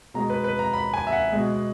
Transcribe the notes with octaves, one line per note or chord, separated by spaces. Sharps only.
B2 G#3 A#5
B4
B4
A#5
B5
G#5
E5
F#5
B2 G#3